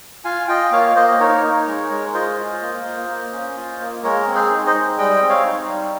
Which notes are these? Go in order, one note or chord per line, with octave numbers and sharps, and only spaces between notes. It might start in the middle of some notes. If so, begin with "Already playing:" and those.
F4 F5 G#5
F4 D#5 G5
A#3 C#5 F5
A#3 C5 D#5
D#5
D#4 A#4 C#5
D#4
G#3
G#3
F4 C5 D#5
F4
A#3
A#3
A#3
C#4
F4
A#3
G#3 A#4 C#5
C4
G#4 C5
D#4
C5 D#5
G#3
G3 D#5 G5
C4
C#5 F5
D#4
G3